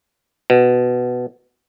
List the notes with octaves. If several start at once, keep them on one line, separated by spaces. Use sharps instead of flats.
B2